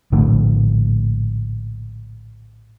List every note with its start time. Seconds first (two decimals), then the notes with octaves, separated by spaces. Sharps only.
0.12 A#1 A2 D3 A3